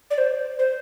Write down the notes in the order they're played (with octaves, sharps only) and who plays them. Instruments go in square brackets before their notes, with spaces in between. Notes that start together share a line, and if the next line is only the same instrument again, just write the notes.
[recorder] D5
C5
C5